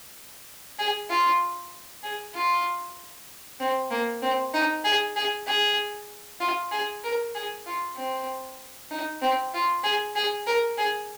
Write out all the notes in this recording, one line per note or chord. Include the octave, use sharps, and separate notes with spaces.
G#4
F4
G#4
F4
C4
A#3
C4
D#4
G#4
G#4
G#4
F4
G#4
A#4
G#4
F4
C4
D#4
C4
F4
G#4
G#4
A#4
G#4